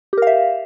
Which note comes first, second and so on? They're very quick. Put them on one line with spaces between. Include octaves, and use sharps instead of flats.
G4 A#4 F5 E5